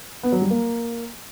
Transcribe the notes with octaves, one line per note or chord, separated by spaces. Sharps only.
B3
F#3
G3
A#3